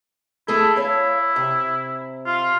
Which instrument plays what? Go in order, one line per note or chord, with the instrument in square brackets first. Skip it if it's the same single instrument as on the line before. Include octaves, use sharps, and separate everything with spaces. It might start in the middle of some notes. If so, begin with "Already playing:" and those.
[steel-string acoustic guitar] A3 G#4 A4 [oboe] E4
[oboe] E4 [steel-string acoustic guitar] C#5 F5
[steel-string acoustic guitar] C3
[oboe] F4